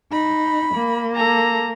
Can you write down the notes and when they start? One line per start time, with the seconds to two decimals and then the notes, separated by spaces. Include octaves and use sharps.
0.12 D#4 B5
0.74 A#3
1.16 A4 A#5